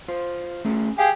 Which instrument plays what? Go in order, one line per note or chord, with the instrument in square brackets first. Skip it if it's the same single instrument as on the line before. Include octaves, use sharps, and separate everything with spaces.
[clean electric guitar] F4 C5
A3 C#4 G#4
[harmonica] G4 G#4 [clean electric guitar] F5